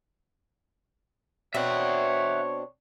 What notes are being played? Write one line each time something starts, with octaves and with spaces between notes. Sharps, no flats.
B2 C4 D4 C#5 E5 F#5